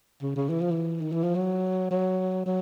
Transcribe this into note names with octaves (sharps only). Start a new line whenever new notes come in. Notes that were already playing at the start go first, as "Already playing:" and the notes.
C#3
C#3
E3
F3
E3
D#3
E3
F3
F#3
F#3
F#3